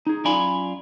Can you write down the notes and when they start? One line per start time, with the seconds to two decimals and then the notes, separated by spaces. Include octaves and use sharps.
0.07 D#4 G#4
0.25 F#2 F4 D5 G#5 B5